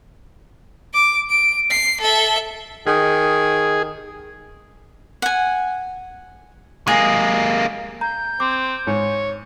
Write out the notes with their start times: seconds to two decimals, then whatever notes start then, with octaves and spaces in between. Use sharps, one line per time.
0.93 D6
1.29 D7
1.70 C7
2.00 A4 E5
2.87 D#3 G#4
5.22 F#5 G#5
6.88 G#3 A#3 G#4
8.01 A#5 G6
8.40 C4 D6
8.87 G#2 C#5